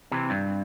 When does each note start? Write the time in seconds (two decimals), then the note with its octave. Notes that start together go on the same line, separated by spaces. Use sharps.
0.12 C3 E3
0.30 G2